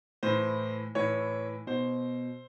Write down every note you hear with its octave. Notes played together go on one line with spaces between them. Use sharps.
A2 E3 C5
A2 E3 C#5
B2 C5